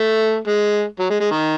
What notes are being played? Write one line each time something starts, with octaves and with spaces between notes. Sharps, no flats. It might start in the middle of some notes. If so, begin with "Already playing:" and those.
Already playing: A3
G#3
F#3
G#3
G#3
D#3